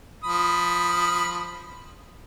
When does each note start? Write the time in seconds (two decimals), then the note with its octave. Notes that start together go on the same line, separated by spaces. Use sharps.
0.24 F3 B5 D#6